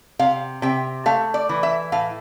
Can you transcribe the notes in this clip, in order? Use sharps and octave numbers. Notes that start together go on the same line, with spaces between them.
C3 F5
C3 G5
A3 F5
D5
E3
E5
A2 F5